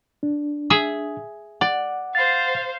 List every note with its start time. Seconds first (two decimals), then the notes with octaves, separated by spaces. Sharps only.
0.23 D4
0.70 G#4 E5
1.61 D5 F#5
2.15 C5 F5 A6